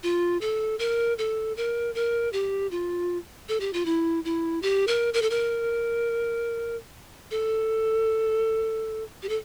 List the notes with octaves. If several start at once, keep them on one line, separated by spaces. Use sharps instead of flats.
F4
A4
A#4
A4
A#4
A#4
G4
F4
A4
G4
F4
E4
E4
G4
A#4
A#4
A4
A#4
A4
G4
A4